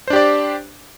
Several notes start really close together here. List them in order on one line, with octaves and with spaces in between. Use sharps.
C5 D4 G4 D5